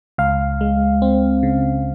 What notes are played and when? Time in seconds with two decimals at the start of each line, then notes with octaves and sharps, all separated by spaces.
0.18 C#2 F5
0.61 G#3
1.02 C4
1.43 C#3